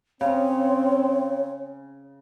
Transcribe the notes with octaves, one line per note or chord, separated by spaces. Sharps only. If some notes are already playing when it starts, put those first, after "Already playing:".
C#3 C4 C#5 F5